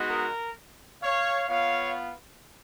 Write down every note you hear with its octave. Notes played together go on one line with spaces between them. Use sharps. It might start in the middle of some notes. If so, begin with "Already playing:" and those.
Already playing: G#3 B3 D#4 F#4
A#4
C#5 F5
B3 F4 C#5 F5